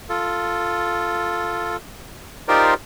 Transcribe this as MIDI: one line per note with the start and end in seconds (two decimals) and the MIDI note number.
0.09 1.77 65
0.09 1.77 69
2.48 2.74 63
2.48 2.74 65
2.48 2.74 67
2.48 2.74 70
2.48 2.74 72
2.48 2.74 74